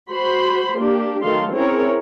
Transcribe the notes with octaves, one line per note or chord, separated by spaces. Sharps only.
F#4 C5 B5 C6
A#3 D4 G4
D#3 F#3 A3 A4 F5 C6
C4 C#4 E4 G#4 A#4 C#5